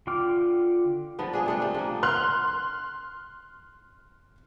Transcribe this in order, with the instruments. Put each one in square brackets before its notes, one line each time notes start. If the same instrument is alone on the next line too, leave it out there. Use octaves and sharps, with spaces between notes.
[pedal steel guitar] D3 F4 G5 D6 F6
[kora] D3 F3 B3
D4 G#4
C3 A3 D4
A3
F3 A#3
[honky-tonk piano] C6 F6 F#6